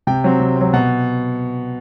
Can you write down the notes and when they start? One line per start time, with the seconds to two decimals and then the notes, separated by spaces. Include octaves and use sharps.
0.07 C3 G5
0.24 F#3 C4
0.40 C3
0.56 F#3 C4
0.73 B2 F#5